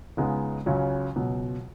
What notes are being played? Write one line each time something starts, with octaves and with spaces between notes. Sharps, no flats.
C#2 C#3 G#3 B3 D#4
C#2 C#3 F#3 C#4
C#2 B2 F#3